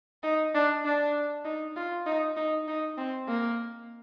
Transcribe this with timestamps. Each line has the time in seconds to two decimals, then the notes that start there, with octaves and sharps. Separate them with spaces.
0.23 D#4
0.55 D4
0.85 D4
1.45 D#4
1.76 F4
2.06 D#4
2.36 D#4
2.68 D#4
2.98 C4
3.28 A#3